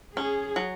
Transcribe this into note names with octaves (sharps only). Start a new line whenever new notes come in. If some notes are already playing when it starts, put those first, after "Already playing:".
C#4 G#4
F#3